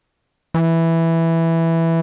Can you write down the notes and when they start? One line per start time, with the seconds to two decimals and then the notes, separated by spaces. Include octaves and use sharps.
0.54 E3